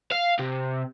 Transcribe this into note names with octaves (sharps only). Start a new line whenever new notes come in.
F5
C3